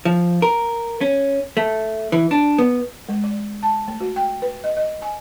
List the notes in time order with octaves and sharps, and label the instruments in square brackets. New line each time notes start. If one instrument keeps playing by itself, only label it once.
[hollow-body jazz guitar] F3
A#4
C#4
A3
E3
D4
B3
[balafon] G#3
D5
A5
A3
F#4
G5
B4
D#5
D#5
G#5